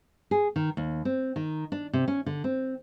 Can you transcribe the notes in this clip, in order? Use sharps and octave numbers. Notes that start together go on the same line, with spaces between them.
G#4
D#3
D#2
C4
D#3
D4
C3
C#4
D3
C4